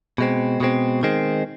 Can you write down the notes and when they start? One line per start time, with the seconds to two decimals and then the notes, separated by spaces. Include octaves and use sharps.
0.18 B2 G#3 C4
0.60 B2 G#3 C4
1.03 D#3 G#3 C4